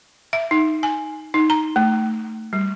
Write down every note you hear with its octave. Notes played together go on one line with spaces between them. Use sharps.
E5
D#4
G#5
D#4
A#5
A3
G3